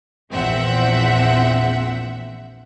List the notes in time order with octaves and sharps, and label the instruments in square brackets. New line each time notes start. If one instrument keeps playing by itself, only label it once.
[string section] A#1 E2 F3 C4 E5 F#5